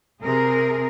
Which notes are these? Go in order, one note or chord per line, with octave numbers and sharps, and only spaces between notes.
C3 G#4 A#4